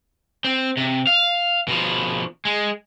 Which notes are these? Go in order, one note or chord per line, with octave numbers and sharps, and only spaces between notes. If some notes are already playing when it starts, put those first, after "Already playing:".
C4
C3
F5
B2 F3
G#3